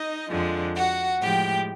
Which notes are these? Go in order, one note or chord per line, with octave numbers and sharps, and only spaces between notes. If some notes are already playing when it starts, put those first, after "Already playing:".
Already playing: D#4 D#5
F2 D3 F3 G#3
F#4 F#5
A2 F3 G#3 G4 G5